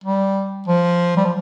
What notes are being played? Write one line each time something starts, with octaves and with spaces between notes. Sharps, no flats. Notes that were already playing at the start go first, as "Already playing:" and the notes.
G3
F3
G3
F3